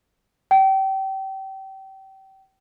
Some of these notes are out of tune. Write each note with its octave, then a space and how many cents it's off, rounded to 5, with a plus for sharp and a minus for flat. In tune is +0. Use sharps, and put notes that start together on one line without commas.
G5 -30